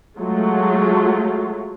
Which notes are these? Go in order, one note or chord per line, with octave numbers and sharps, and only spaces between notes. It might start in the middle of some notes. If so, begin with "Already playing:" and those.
F#3 G#3 A3 F4